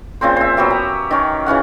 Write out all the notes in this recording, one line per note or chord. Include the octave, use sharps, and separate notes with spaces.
A#2 C#3 C4 C5
C5 E5
F#3 B3 G4 E5
A#5
D#3 C#4
C#3 E3 C#4 F#5